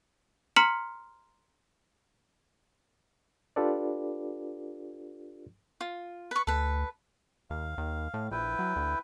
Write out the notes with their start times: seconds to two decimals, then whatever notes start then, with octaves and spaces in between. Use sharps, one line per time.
0.56 A#5 C6 F6 B6 C#7 F#7
3.56 D4 F4 G4 A4 B4 D5
5.81 F4
6.31 B4 C#6
6.47 D2 A4 B4
7.50 D#2 F5
7.78 D#2
8.14 A2
8.31 A#1 E4 B4 G5
8.59 F#3
8.76 D2